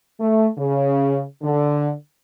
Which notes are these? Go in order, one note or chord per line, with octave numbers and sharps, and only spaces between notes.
A3
C#3
D3